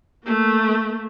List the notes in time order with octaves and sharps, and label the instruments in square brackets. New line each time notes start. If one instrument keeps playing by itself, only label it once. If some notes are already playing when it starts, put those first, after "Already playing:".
[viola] A3 A#3